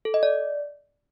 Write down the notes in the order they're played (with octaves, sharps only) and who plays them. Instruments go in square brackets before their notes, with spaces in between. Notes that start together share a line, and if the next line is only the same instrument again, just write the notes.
[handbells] A4
D#5
D5